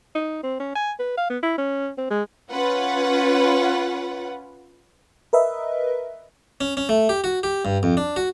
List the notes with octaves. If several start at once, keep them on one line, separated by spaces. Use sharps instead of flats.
D#4
C4
C#4
G#5
B4
F5
B3
E4
C#4
C4
G#3
C#4 F4 B4 F#5
A#4 B4 D#5 E5
C#4
C#4
A3
G4
F#4
G4
G2
F2
D4
F#4